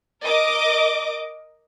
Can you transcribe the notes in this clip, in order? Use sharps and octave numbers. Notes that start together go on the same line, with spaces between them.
A#4 D#5 D6